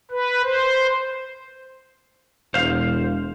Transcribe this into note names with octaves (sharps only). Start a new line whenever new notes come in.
B4
C5
E1 C5 F5